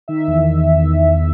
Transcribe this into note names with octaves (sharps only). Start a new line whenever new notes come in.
D#3 E5
E2
D#3